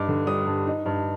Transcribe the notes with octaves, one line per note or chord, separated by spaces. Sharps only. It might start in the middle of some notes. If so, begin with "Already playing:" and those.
Already playing: G2 D#4 D6
D3
G3 D#6
G2
D#4
G2